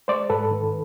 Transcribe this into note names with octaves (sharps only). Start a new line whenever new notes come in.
G#3 C5 D5
G#2 A4 B4
D#3